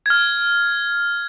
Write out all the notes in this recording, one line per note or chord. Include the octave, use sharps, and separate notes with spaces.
F6 G#6